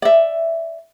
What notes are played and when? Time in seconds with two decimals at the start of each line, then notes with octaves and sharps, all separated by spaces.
0.02 D5 E5